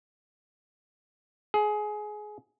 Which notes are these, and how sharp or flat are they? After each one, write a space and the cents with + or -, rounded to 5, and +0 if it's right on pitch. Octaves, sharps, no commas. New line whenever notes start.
G#4 +20